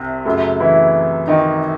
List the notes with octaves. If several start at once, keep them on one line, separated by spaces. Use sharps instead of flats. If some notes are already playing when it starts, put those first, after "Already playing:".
Already playing: C2 C3
F#2 C#3 F#3 A3
E3 E4
D#3 D#4